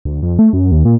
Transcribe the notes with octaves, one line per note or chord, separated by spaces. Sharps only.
D2
F2
A3
F#2
D#2
A#2